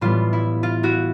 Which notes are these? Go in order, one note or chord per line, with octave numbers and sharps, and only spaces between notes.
A2 E3 G3 B3 F4
E4
F4
E4 F#4